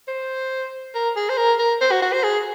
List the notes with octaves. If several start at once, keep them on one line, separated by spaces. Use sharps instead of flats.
C5
A#4
G#4
C5
A#4
A#4
C5
F#4
F#4
C5
G#4